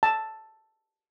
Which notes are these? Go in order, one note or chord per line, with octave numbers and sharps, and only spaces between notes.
A5